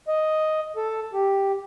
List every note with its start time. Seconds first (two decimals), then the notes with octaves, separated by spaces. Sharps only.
0.08 D#5
0.76 A4
1.13 G4